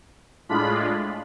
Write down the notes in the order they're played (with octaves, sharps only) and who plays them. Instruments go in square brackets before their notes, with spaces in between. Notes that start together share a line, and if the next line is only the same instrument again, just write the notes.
[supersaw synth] A2 G#3 D4 F4 B5